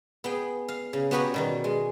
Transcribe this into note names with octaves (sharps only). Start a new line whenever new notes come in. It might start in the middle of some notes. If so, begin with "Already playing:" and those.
B3 G#4 G5
F5
C#3
B3 F#4 G4 B4 C#5 A#5
B2 D#3 G3
G#3